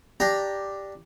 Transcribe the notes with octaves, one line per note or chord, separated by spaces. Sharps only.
D4 G4 G5 A#5